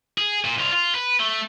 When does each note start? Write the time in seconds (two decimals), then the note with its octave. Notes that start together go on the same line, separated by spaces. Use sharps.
0.18 G#4
0.45 A#2
0.58 C2 F4
0.73 F4
0.95 B4
1.20 A3